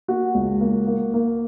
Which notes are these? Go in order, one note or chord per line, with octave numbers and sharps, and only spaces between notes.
A#3 F#4
C#2
A#3
A#3
A#3